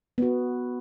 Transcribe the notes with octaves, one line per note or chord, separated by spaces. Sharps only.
B3 F#4